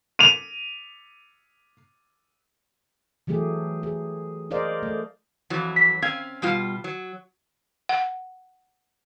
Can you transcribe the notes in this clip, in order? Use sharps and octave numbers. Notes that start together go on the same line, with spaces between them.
D#7 F7
E3 F#3 A3 G4 G#4
G#4
G#4 A#4 C5 D5 D#5 F5
A3
F2 E3 F#3
B6
C4 C#4 F5 G#6
B2 G3 F4
F#3
F#5